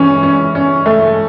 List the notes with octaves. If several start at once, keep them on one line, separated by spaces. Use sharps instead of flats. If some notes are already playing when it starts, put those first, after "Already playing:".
Already playing: E3 C#4
C#4
C#4
A3